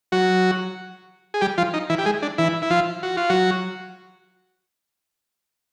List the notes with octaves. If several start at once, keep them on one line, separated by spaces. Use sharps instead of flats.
F#3 F#4
G#4
G3 G4
F3 F4
D#4
E3 E4
G4
G#3 G#4
D4
E3 E4
E4
F3 F4
F#4
F4
F#3 F#4